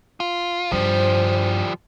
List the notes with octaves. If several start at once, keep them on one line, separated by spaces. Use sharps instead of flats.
F4
G2 F3 G3 C5